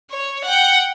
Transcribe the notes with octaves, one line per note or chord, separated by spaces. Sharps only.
C#5
F#5 G5